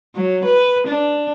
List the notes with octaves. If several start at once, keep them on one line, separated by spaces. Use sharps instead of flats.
F#3
B4
D4